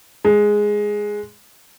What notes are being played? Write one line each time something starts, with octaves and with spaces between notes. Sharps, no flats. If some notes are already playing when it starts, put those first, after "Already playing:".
G#3